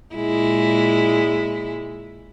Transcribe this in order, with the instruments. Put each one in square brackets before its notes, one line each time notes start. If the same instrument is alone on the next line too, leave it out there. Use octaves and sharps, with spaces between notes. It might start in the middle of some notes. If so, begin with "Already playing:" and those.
[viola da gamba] A#2 G#3 E4